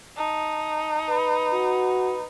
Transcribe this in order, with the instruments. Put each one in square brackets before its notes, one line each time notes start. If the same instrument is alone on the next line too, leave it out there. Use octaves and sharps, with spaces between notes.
[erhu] D#4 [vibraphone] A5
[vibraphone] B4 B5
[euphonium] F#4